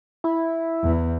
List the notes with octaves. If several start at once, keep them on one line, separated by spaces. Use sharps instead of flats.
E4
E2